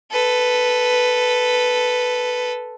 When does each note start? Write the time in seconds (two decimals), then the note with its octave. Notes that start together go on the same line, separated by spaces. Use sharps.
0.12 A4 B4